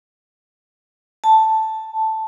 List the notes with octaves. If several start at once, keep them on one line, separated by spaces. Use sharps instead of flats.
A5